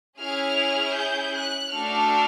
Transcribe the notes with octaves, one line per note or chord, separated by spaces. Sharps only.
C#4 E4 G#4 F6
G6
F#6
A3 D4 F#4 A4 F6